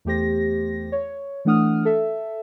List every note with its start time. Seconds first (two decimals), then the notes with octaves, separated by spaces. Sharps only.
0.05 E2 A3 G4 C5 A#6
0.92 C#5
1.45 E3 A3 D4 F#5 D#6 F6
1.85 A4 E5